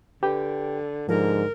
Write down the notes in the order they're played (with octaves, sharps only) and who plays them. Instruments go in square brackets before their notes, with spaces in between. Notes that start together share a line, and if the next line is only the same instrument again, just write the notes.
[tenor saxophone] D3 [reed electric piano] G4 B4 G5
[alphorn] G#2 [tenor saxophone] D3 [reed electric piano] F3 [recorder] A#4